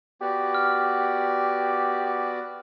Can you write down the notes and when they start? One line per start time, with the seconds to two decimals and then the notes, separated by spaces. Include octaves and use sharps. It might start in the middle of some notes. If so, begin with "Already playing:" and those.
0.21 B3 F#4 G4 D5
0.55 F6